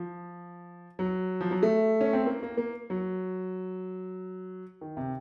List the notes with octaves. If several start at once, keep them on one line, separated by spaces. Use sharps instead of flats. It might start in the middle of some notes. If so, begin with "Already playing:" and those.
Already playing: F3
F#3
F3
F#3
A3
C#4
C4
A#3
A#3
A#3
F#3
D#3
C3